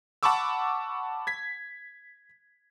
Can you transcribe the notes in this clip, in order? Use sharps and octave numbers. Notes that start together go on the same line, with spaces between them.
F#5 A5 B5 C#6 D6 E6
G#6 B6